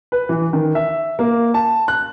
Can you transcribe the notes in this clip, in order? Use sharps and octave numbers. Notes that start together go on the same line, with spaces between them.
B4
E3
D#3
E5
A#3
A5
F#6